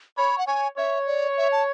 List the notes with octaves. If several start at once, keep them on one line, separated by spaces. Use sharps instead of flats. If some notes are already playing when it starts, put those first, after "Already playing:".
C#5 B5
F#5
C#5 G#5
C#5 E5
D5
E5
A5